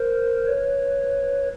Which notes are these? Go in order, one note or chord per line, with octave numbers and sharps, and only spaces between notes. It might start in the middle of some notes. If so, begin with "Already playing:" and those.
Already playing: A#4 C5
B4 C#5